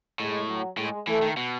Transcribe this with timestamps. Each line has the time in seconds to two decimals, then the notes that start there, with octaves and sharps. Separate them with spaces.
0.19 A2 G#3
0.48 F#3
0.78 A2 G#3
1.07 E3 A3
1.22 D#3
1.37 B2